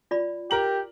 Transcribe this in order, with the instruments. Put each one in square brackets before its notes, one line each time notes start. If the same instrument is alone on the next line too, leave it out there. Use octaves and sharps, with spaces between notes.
[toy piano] F4 D5 B5
[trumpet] G4 [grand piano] A#4 A#5 F#7